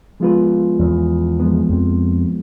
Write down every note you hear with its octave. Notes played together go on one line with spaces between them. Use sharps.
F3 G#3 B3 F4 B4
E2
F3 G#3 B3
F2